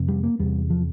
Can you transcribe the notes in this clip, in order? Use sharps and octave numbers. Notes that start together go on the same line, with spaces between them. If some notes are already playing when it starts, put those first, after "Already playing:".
Already playing: F2 C3
G3
A#3
E2 C3 G3
F3